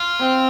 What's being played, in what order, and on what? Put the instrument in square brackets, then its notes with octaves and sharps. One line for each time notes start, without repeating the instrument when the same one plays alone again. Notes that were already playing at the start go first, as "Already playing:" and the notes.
Already playing: [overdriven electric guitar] F4
[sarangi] C4